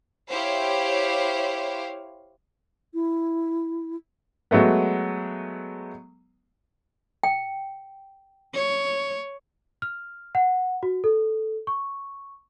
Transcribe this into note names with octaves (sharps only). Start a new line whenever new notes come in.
E4 G4 C5 C#5 F5
E4
F#3 G#3 A3 B3
G5
C#5
F6
F#5
F#4
A4
C#6